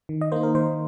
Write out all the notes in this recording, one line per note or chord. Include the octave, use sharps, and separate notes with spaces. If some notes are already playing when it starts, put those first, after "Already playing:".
D#3
D#5
A#3 D#4 C5
A#4
D#3 C5